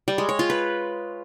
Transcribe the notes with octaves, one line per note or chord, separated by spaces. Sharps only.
G3
G#3
C#5
F4
B4